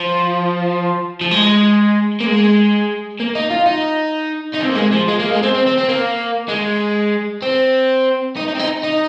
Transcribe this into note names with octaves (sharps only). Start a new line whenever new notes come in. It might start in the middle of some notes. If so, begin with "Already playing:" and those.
Already playing: F3
F3
G#3
A#3
G#3
A#3
D#4
F4
D#4
D#4
C4
A#3
G#3
F3
G#3
A#3
G#3
C4
C4
C4
C4
A#3
G#3
C4
D#4
D#4
C4
D#4
D#4